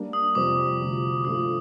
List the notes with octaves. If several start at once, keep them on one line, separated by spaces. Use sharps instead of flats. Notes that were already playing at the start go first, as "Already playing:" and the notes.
Already playing: G3 A#3 D4
D#6
F2 C3 G3 C4 G4 D6
D2 C3 F3
G2 F3 A3 D#6